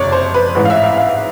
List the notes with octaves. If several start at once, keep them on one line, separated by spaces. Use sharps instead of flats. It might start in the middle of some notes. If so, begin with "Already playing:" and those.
Already playing: F#1 F2 C3 C#5 D5
C5
B4
A1 G#2 E3 B4
F5
E5
F5
F5